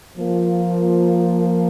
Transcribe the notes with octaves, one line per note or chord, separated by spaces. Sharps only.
F3 A#3 F4